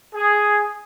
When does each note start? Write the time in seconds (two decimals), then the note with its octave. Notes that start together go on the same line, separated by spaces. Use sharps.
0.14 G#4